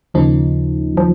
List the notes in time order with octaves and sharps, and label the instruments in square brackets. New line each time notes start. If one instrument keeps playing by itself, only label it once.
[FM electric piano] D#2 C#3 A#3 D#4 [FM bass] F3
[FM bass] F3